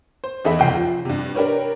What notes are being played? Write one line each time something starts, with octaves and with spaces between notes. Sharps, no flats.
C5
E2 D#4 G#4 A4 E5 B5
F#1 C2 F2 G5 C7
F3
G2 C3
D4 G4 A#4 B4 C#5